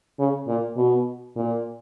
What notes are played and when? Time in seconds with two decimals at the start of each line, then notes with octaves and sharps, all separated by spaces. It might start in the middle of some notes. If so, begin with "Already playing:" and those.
0.19 C#3
0.47 A#2
0.77 B2
1.36 A#2